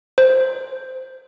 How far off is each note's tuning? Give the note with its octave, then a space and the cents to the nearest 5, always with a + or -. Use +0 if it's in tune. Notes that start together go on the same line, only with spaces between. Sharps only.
C5 -10